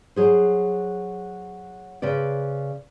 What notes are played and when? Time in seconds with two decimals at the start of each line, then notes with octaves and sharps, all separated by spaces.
0.16 F#3 G#4 C5
2.02 C#3 B4 C5 D5